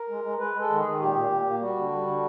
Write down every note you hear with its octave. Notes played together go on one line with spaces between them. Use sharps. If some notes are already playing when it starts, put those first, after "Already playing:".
Already playing: A#4
G#3
G#3
G#3 B4
G#3 A4
D#3
G#4
D#3
A#2 G4
A#2
A#2
A#3
G3 F#4
D3
G3
D3